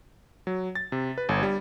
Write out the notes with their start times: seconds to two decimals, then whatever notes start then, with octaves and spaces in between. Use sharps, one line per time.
0.47 F#3
0.75 A6
0.92 C3
1.18 B4
1.29 G1
1.43 G3